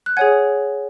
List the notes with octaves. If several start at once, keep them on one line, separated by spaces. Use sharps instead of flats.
F#6
G#4 C#5 F#5 G#5 G#6